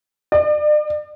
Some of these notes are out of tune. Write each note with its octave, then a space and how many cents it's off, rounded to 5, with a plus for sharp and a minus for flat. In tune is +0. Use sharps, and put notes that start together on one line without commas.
D5 +40